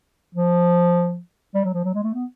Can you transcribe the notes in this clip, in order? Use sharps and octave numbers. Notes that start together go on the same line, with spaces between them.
F3
G3
F#3
F3
F#3
G#3
A3
B3